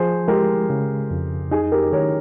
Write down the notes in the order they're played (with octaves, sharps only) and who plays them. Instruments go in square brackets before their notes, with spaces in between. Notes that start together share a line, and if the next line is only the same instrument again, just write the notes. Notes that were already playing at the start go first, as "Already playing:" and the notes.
Already playing: [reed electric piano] F3 [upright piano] G#4 C5
[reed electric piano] G#3 [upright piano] G4 A#4
[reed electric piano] C#3
F2
[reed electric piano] D#4 [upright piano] G#4
[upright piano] G4 A#4
[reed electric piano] D#3 [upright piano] A#4 C#5